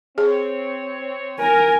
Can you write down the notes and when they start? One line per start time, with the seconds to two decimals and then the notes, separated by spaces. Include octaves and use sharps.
0.18 C4 G#4 C#5
1.39 A#4 G#5